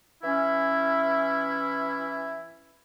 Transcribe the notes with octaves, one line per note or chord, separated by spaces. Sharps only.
E3 C#4 E4